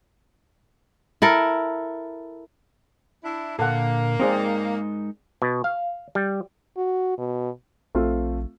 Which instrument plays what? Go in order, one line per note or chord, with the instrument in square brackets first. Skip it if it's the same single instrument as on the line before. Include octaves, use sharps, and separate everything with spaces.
[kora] E4 A4 A#4
[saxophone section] D4 E4
[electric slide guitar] A#2 D3 [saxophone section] A#3 [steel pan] A4 F#5
[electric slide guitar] G#3 D#4 A#4 [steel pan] C4 G#4 D5
[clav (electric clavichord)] B2
F5
G3
[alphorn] F#4
B2
[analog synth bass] A#1 [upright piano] A3 C4 F4